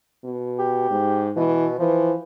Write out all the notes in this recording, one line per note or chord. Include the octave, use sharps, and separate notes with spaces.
B2
G4
G#2
B2 E3
E3 F3